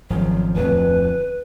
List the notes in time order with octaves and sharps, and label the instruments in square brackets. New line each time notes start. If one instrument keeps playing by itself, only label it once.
[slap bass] G#1 F3 [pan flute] F#3
[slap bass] D1 F2 [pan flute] B4